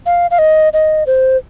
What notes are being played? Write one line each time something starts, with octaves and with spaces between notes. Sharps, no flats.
F5
F5
D#5
D#5
C5